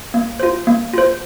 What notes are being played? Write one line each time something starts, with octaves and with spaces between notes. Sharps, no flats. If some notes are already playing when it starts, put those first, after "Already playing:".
A#3
F4 C5
A#3
F4 C5